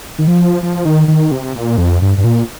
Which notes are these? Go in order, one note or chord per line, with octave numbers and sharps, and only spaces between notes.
D#3
F3
F3
D#3
D#3
C3
A#2
F2
G2
G2
A#2